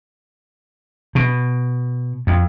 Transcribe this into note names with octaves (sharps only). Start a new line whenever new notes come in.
B2
F2